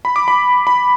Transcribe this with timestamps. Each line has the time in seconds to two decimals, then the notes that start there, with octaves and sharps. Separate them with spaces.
0.05 B5
0.16 D6
0.28 B5
0.67 B5